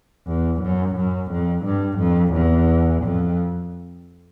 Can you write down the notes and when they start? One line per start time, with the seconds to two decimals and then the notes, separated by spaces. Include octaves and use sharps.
0.28 E2
0.62 F#2
0.96 F#2
1.31 F2
1.65 G2
1.99 F2
2.34 E2
3.03 F2